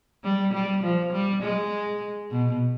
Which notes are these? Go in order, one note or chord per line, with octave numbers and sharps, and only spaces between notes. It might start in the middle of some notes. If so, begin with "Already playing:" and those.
G3
G3
F3
G3
G#3
B2